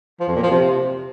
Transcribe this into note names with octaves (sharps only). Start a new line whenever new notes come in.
F3
F2
A#2
F3
C3